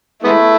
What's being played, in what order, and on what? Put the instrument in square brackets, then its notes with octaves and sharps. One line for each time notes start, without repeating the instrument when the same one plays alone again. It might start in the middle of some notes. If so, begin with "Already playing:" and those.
[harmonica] G#3 B3 E4 [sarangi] A3